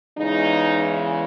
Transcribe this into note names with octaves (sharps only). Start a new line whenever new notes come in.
E2 C#3 E3 G#3 D#4